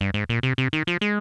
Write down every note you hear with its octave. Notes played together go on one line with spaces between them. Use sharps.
G2
G#2
A#2
C3
C3
D#3
F3
G#3